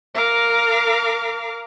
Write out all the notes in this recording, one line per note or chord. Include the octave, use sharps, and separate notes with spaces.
A#4 F5 A#5 D6